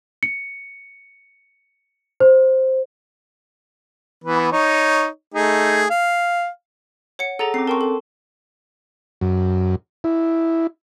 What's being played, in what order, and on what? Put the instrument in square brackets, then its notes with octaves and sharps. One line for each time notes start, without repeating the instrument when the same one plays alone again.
[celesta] C#7
C5
[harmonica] E3 B3 B4
D#4 C#5
A3 D#4 G#4
F5
[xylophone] C#5 F#5 C#7
[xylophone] G#4 F#5 [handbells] A4 A#5 A6
[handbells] C4 C#4 D6 [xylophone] C7
[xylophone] A#4 G5 C#6 [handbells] A5 C6
[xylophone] A4
[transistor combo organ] F#2
E4